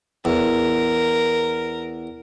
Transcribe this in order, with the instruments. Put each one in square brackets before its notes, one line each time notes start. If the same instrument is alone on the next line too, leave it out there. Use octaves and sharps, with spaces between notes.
[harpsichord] E2 [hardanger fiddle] A#4